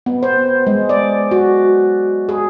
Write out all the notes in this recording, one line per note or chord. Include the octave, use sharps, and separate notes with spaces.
B3
C5
G#3
D5
F#4
G#4